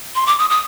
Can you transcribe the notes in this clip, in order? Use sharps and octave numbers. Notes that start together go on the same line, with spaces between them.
C6
D6
D#6
D#6